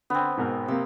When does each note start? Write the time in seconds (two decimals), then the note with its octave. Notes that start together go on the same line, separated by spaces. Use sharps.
0.10 D3 B3 C4
0.37 G#2 B2 A#4
0.68 C3 A#3 E6